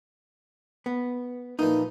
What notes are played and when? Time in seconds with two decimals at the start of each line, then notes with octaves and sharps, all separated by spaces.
0.86 B3
1.59 A#2 E3 F3 D#4